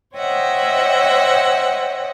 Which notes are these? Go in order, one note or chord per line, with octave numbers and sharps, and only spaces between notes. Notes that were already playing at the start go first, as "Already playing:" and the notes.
C5 C#5 D#5 E5 F#5 G5